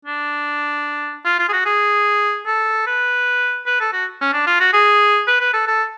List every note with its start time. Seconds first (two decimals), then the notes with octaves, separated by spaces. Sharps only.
0.05 D4
1.25 F4
1.39 F4
1.49 G#4
1.52 F#4
1.65 G#4
2.46 A4
2.87 B4
3.66 B4
3.81 A4
3.93 F#4
4.21 C#4
4.33 D4
4.47 F4
4.60 F#4
4.73 G#4
5.27 B4
5.40 B4
5.53 A4
5.67 A4